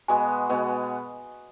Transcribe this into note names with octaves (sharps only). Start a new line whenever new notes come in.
B2 G#3 B3 F#4 G#5
B2 G#3 B3 F#4